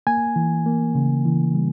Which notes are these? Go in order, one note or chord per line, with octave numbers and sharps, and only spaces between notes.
A#3 G#5
E3
A#3
C#3
E3
G3